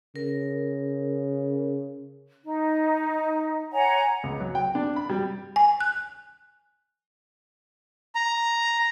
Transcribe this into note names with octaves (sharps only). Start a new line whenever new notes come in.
C#3 A#4
D#4
C#5 F#5 G#5 A#5
C#2
F#3
G5
D4
B5
G3
G#5
F#6
A#5